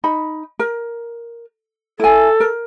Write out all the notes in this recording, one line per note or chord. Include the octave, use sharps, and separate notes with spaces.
D#4 B5
A#4
E4 A4 G#5
A#4